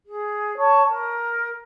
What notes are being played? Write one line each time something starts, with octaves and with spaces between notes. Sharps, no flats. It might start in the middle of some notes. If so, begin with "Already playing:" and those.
G#4
C#5 A5 C#6
A#4